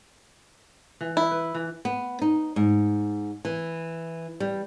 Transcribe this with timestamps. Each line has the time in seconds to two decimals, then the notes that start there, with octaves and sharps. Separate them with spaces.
1.01 E3
1.17 E4
1.31 B4
1.55 E3
1.85 B3
2.22 D#4
2.56 G#2
3.45 E3
4.40 G3